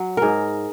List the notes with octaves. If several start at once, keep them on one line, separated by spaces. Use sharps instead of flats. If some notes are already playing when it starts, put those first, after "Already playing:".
Already playing: F#3
G#2 G#4 A#4